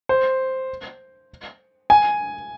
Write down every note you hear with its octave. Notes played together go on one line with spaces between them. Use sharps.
C5
G#5